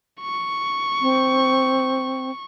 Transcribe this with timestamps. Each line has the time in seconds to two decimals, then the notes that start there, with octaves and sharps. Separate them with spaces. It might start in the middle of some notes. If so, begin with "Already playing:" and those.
0.21 C#6
1.01 C4